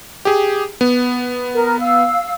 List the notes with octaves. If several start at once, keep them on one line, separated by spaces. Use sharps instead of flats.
G4 G#4
B3
A#4
F5 E6